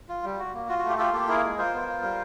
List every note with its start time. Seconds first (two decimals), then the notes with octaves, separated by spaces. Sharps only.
0.09 F4
0.24 G3
0.39 F#4
0.54 A#3
0.68 F4 F#4
0.79 F#4
0.84 A3 G4
0.98 F4 G4 A4
1.13 A#3 G4 A4
1.28 E4 G#4 A#4
1.44 G#3
1.58 F4 A#4 C5
1.74 B3
1.88 F4
2.03 G3